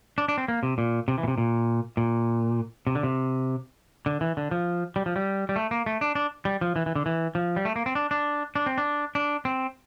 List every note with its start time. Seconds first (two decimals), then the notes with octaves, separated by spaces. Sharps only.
0.18 D4
0.28 D4
0.38 C4
0.48 A#3
0.63 C3
0.78 A#2
1.08 C3
1.18 E3
1.23 A#2
1.28 C3
1.38 A#2
1.97 A#2
2.87 C3
2.95 D3
3.03 C3
4.06 D3
4.21 E3
4.37 D3
4.51 F3
4.96 G3
5.06 F3
5.16 G3
5.49 G3
5.56 A3
5.71 A#3
5.86 A3
6.01 D4
6.15 D4
6.45 G3
6.61 F3
6.76 E3
6.86 E3
6.95 D3
7.06 E3
7.35 F3
7.56 G3
7.65 A3
7.76 A#3
7.86 C4
7.95 D4
8.11 D4
8.56 D4
8.66 C4
8.78 D4
9.15 D4
9.45 C4